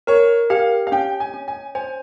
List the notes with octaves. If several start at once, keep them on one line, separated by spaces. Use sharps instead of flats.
A#4 C#5
G4 F5
F5
C#4 G5
G#5
C#4
G#5
C5 G#5